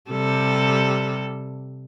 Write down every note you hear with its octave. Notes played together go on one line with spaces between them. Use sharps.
C3 G3 A4